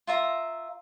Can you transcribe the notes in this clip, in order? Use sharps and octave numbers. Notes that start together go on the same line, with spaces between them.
F4 E5 A#5